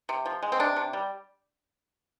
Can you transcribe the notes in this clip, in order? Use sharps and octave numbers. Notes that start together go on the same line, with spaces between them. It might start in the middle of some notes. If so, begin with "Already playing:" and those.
C3
F3
G#3
C4
C3 D4
C3
G3